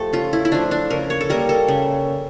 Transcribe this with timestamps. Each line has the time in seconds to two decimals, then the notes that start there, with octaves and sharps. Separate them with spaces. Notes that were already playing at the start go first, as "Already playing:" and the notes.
Already playing: F3 A3 G4 A4
0.13 C#3 F4
0.33 E4
0.45 E4
0.52 F3 A3 D4
0.71 D4
0.90 C#3 A#4
1.10 C#5
1.21 A4
1.30 G3 A#3 A#4
1.49 A4
1.68 C#3